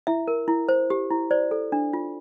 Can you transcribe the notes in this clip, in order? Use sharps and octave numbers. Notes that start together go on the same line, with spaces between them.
E4 E5
A#4
E4
C5
G4
E4
C5 D5
A4
D4
F4